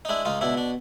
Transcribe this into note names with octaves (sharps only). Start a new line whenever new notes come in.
D#4
G#3 D4 E4
C#2 D#4 F4
B2 D4 E4
D4